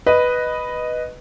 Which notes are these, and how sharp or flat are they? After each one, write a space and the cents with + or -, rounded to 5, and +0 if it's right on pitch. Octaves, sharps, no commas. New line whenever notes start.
B4 +0 D#5 -5